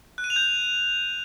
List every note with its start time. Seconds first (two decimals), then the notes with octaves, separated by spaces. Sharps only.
0.18 F#6
0.24 D#7
0.30 F7
0.36 G6